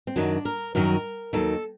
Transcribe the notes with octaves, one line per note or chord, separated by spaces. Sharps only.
C4
F#2 D#3 F#3 D4
A#4
F#2 D#3 F#3 A#4
D#2 D#3 F#3 A4